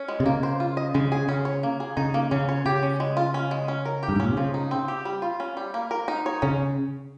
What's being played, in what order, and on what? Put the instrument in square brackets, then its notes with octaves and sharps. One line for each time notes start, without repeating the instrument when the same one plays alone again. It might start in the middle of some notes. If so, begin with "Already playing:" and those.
Already playing: [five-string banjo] C#4
G#3
[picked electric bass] C3
[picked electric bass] C#3 [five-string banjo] A#3
[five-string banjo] C5
F4
D#5
[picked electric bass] C#3 [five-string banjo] G#3
[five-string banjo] G#4
[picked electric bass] C#3 [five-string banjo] C#4
[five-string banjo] C#5
A#3
G#4
[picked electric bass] C#3 [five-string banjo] D#4
[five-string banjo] A#3
[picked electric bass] C#3 [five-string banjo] C#4
[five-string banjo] C#5
[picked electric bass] C#3 [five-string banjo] G4
[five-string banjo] C#4
G#3
F4
C#4
G#3
C#4
A#4
G4
[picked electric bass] G2
G#2
[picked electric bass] A#2 [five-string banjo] C#4
[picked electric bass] C3
[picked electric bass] C#3 [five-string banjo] F3
[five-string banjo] D#4
C4
G4
G3
F4
C#4
G3
A#3
A#4
D#4
C#5
[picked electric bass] C#3 [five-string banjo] C#4